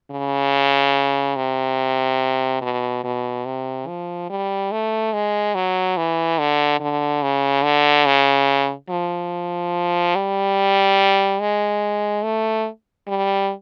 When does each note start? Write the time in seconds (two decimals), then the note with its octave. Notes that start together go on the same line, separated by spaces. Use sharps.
0.11 C#3
1.36 C3
2.61 B2
3.04 B2
3.46 C3
3.87 F3
4.30 G3
4.72 A3
5.13 G#3
5.55 F#3
5.97 E3
6.39 D3
6.80 D3
7.22 C#3
7.64 D3
8.06 C#3
8.90 F3
10.15 G3
11.41 G#3
12.24 A3
13.08 G3